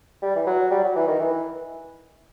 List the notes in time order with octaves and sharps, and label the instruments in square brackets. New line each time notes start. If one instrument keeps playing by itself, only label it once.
[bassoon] G3
E3
F#3
G3
F#3
E3
D#3
E3